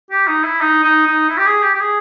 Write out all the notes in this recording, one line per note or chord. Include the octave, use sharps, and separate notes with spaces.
G4
D#4
E4
D#4
D#4
D#4
E4
G4
G#4
G4
G4
G#4